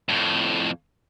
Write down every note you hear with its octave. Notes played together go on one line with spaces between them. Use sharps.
F2 A2